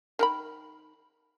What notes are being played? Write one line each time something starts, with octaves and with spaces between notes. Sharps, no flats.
D#3 A#4 B5